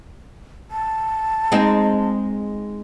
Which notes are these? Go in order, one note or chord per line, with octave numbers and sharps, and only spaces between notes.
A5
G#3 C4 D#4